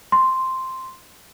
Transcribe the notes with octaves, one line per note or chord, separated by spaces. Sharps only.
C6